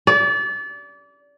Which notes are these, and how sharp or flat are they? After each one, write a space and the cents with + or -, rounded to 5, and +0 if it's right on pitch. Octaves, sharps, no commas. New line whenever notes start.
D5 -30